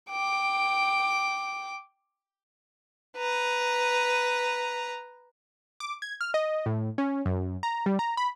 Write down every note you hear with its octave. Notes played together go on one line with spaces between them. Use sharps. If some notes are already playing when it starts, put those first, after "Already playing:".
G5 D6
B4 A#5
D6
G#6
F6
D#5
A2
C#4
F#2
A#5
G3
A#5
B5